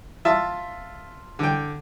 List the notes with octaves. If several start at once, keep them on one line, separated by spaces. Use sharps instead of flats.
F4 E5 A5
D3 G5